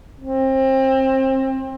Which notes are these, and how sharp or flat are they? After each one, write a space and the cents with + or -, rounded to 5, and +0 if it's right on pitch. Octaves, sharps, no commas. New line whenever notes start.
C4 +25